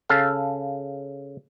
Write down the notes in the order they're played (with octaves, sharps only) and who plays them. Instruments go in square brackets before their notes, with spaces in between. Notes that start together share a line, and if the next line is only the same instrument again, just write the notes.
[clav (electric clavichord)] C#3 A4 F5